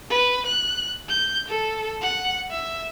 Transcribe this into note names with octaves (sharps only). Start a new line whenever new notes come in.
B4
F#6
G6
A4
F#5
E5